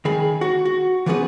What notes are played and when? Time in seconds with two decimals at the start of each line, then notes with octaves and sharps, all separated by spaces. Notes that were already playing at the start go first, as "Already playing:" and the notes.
0.05 D#3 G#4 B5
0.41 F#4
0.65 F#4
1.06 E3 F3 B3 C#4 G#4 B4